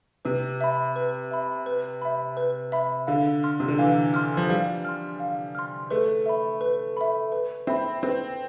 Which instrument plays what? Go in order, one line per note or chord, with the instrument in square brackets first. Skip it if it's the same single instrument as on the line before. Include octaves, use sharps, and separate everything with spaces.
[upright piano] C3 [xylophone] B4
[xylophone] E5 B5
B4
E5 B5
B4
E5 B5
B4
E5 B5
[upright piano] D3 [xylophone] F5
[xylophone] C6 F6
[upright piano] C3
D3
[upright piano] E3 [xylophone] F5
[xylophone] C6 F6
[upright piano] F3
[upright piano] G3 [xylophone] F5
[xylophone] C6 F6
F5
C6 F6
[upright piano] A3 [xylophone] B4
[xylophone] E5 B5
B4
E5 B5
B4
[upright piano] C4 [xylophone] E5 B5
[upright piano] C4 [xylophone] B4